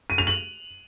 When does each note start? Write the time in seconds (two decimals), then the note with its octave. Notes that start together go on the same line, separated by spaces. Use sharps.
0.10 D#7
0.18 F7
0.27 F#7